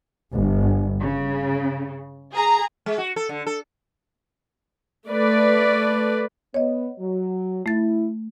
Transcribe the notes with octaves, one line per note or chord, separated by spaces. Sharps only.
G1
C#3
G#4 A#5
G#3
F#4
A4
D3
A4
A3 B4 D5
B3 C#5 D#5
F#3
A3 E4 A6